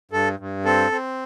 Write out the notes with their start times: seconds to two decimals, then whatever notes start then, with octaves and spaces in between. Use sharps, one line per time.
0.11 G2 A4
0.39 G2
0.65 C4 A4
0.92 C4